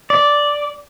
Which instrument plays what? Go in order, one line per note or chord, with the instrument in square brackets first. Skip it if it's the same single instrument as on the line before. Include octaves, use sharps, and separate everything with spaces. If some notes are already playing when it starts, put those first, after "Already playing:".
[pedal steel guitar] D5